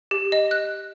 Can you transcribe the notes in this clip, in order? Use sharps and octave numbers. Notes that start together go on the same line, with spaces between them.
G4
D#5
F#6